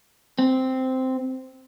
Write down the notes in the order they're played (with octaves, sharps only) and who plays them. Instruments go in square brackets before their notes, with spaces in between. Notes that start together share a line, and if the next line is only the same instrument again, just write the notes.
[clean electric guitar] C4